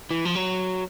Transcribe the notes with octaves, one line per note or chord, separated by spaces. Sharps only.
E3
F3
F#3